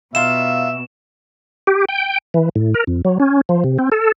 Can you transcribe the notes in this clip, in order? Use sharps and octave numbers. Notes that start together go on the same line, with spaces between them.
B2 D#4 F4 E5 F5 E7
G4
G5
E3
A2
A#4
F2
F#3
C#4
F3
C3
C4
A4